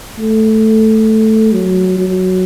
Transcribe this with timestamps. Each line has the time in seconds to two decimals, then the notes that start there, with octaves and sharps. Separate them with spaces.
0.18 A3
1.53 F#3
1.98 F#3